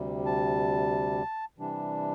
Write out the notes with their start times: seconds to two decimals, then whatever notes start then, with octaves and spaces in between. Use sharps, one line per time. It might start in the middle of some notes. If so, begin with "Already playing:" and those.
Already playing: D2 C3 G3
0.26 A5
1.58 C3 E3 G3 D4